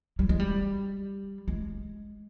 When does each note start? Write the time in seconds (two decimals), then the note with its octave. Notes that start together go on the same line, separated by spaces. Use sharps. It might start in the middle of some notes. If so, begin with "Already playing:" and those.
0.19 G3
0.29 G#3
0.40 G3
1.48 G#3